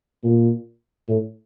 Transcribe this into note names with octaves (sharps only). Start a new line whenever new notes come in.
A#2
A2